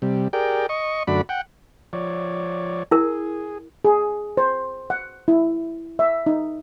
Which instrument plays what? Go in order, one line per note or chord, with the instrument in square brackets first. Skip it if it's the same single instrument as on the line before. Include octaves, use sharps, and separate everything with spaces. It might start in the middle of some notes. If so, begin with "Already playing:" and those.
[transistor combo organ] C3 G3
G4 G#4 A#4 D5 G5
D#5 C#6
F#2 D3 A3 F#4 D5 B5
F#5 G5
F3 C#5 D5
[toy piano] E4 A#4 [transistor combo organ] G#4
[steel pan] G#4
C5
F#5
E4
E5
D#4